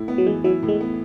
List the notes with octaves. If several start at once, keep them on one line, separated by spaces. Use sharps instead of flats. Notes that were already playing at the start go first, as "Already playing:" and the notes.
Already playing: A2 E4
B3
F#3
E3 G#3
F#3 E4
A2
G#3
B3